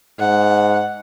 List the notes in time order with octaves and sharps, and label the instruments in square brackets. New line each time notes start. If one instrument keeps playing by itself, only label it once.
[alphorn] G#2 [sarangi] F#5